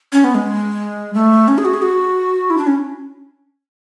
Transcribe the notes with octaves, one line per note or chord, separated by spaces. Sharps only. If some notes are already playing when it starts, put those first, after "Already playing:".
C#4
B3
G#3
A3
C#4
G#4
F#4
G#4
F#4
E4
D4
C#4